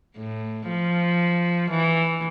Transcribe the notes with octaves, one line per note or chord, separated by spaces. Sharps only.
A2
F3
E3